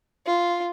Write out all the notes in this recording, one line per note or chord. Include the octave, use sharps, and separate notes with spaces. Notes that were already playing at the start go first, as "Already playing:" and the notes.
F4